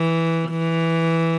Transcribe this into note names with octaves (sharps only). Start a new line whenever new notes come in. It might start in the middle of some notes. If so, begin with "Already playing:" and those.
Already playing: E3
E3